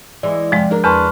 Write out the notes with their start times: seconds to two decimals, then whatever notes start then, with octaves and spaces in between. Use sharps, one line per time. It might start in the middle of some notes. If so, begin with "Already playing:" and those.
0.23 E3 G#3 D5
0.52 F2 C3 F3 G#3
0.71 D4 G#4 A#4
0.84 E2 B4 A5 C6 C#6 F6